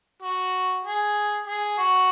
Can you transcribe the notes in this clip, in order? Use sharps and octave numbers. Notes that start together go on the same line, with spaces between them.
F#4
G#4
G#4
F#4